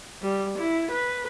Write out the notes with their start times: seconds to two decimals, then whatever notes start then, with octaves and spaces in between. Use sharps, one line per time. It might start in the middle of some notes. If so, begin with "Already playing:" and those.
0.22 G3
0.58 E4
0.91 B4